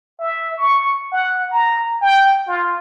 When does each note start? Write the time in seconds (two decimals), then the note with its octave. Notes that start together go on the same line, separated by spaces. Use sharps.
0.19 E5
0.58 C#6
1.12 F#5
1.51 A#5
2.01 G5
2.47 F4